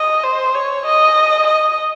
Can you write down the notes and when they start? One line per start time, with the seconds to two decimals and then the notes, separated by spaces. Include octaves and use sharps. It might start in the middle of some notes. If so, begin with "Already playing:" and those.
Already playing: D#5
0.24 C5
0.55 C#5
0.86 D#5
1.47 D#5